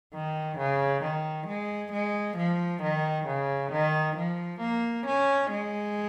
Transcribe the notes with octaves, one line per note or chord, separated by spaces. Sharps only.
D#3
C#3
D#3
G#3
G#3
F3
D#3
C#3
D#3
F3
A#3
C#4
G#3